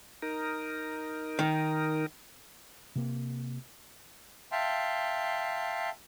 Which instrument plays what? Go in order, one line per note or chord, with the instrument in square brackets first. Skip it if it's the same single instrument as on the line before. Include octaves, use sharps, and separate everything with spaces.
[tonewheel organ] D#4 A#4
[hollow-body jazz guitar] D#3
[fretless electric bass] C3 A#3
[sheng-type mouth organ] E5 F5 G5 A5 C6